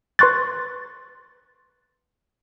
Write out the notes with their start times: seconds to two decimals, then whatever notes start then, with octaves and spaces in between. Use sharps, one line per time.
0.19 B4 C6 C#6 F#6 A6